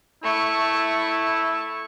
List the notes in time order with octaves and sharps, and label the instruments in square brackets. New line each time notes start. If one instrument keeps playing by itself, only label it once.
[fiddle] A3 C#6 [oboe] E4